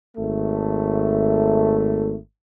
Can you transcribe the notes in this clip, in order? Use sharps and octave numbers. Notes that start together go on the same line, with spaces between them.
G#1 A3